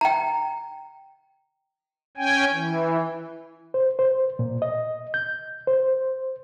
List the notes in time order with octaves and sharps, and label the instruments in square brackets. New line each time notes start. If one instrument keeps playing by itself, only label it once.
[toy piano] G5 A#5
[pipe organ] C#4 G5 G#5
E3
[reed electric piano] C5
C5
A#2
D#5
G6
C5